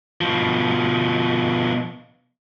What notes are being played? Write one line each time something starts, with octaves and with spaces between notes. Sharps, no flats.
B2 F3